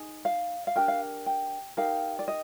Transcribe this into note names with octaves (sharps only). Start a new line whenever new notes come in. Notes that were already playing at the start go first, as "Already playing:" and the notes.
Already playing: D#4 G#4
F5
F5
D4 G4 A#4 G5
F5
G5
D#4 G4 A#4 F5
D5
D#5